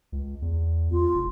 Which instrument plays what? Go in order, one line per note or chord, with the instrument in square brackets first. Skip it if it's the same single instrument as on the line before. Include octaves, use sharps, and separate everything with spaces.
[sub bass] C#2
E2
[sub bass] E2 [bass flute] F4
[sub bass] F1